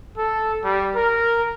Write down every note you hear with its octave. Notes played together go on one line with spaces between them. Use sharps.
A4
G3
A#4